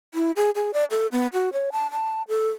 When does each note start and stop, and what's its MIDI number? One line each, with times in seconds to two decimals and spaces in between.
0.14 0.31 64
0.36 0.50 68
0.55 0.71 68
0.74 0.84 74
0.91 1.07 69
1.12 1.27 59
1.33 1.50 66
1.53 1.70 73
1.72 1.91 81
1.91 2.22 81
2.28 2.49 69